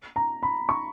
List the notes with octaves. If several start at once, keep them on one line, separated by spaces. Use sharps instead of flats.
A#5
B5
C#6